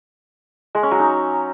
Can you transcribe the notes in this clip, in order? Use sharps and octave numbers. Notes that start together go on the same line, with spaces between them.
G#3
C#4
F#3
D#4